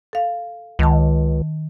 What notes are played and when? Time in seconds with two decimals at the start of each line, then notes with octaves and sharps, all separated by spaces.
0.13 A4 F5
0.79 C#2 D#3 A5